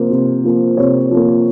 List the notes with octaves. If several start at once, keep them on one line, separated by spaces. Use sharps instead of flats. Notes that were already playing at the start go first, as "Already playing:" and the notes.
Already playing: C3 F3 A#3 C5
C3
F3 A#3
C3 C#5
F3
A#3